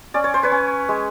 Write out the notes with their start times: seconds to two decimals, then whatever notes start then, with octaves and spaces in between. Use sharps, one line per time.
0.14 C#4 D5
0.24 C#5
0.34 C5
0.43 B4 C#5
0.52 C#4
0.89 G#3